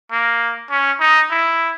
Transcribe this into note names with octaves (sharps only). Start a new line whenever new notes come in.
A#3
C#4
D#4
E4